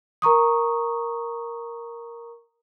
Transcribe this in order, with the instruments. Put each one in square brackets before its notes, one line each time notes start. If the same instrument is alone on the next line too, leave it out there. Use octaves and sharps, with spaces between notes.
[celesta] A#4 A#5 C#6 D#6